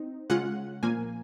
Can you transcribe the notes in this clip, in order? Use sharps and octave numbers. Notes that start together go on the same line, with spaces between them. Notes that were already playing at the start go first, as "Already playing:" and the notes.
Already playing: C4 D#4
C#3 G#3 C#4 F4 F#5
A#2 F3 A#3 G#5